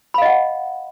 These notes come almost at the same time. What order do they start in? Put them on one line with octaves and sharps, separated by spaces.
B5 F5 D#5 F#5